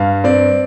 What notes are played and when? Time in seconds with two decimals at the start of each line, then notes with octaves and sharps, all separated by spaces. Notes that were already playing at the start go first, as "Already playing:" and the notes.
Already playing: G2 F5
0.24 C4 D5